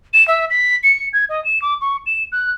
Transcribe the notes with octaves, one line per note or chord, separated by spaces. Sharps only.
E7
E5
B6
C#7
G#6
D#5
E7
D6
C#6
E7
F#6